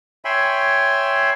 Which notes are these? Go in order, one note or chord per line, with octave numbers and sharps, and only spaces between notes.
C#5 E5 G5 G#5 B5 C6